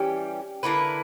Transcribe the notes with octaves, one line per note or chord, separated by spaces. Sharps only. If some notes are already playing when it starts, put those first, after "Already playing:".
Already playing: E3 G3 C#4 G4
D3 A#3 E4 B4